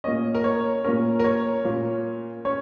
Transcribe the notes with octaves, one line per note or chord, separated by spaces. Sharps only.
A#2 A#3 C#4 D#5
A#4
C#5
A#2 A#3 C#4 A#4
A#4
C#5
A#2 A#3 C#4
C#4 C#5